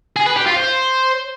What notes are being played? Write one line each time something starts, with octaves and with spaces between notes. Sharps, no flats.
G#4
B4
G4
F4
C5